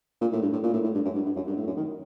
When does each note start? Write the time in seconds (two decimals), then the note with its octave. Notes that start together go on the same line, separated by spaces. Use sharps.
0.21 A#2
0.32 A2
0.42 G2
0.53 A2
0.63 A#2
0.74 A2
0.84 A2
0.95 G2
1.05 F#2
1.15 G2
1.25 G2
1.36 F#2
1.47 G2
1.57 A2
1.67 F#2
1.77 D#3